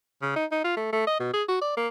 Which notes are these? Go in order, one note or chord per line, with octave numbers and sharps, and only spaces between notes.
C#3
D#4
D#4
F4
A3
A3
D#5
B2
G#4
F#4
D5
A#3